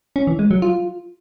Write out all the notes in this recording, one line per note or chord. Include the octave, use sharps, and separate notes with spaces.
C#4
E3
G#3
F#3
F4